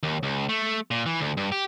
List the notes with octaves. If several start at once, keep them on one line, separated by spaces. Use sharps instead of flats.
D#2
C#2
A3
A#2
E3
D2
G2
G4